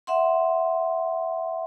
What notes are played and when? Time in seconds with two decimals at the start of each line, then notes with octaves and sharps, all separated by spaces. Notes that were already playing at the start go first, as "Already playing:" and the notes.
0.07 E5 F#5 C6